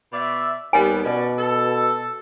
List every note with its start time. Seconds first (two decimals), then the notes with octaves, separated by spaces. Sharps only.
0.12 B2 D5 E5
0.73 D#2 G3 B3 G#5
1.05 B2 C#4 D5
1.38 A4